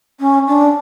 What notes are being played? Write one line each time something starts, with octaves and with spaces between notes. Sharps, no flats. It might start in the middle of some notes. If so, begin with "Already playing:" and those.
C#4
D4